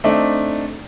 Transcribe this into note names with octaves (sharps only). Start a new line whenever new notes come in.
A3 C4 D4 D#4